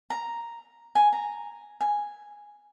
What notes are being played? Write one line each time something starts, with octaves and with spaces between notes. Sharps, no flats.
A#5
G#5
A#5
G#5